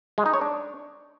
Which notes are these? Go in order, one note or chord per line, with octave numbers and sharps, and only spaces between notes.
G#3
D#4
C#5
D4